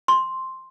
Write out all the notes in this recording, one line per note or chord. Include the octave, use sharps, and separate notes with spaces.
C6